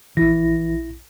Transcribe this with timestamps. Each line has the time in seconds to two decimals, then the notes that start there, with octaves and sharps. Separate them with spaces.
0.17 A#1 E3 E4 A#6